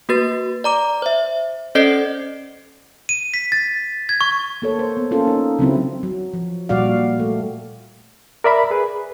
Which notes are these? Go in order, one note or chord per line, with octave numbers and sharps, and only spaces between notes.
A#3 F#4 B4 A6
D5 A#5 D6
C5 E5
C#4 A4 C5 D5 D#5 C7
D#7
B6
A6
G#6
C#6
A#3 A4 C#5
C5
B3
A#3 C#4 F4 A4
D#4
C#3 F#3 C4 E4
F#3
F3
A#2 G3 F#4 D5 F5
A3
A#4 D5 E5 B5
G#4 B4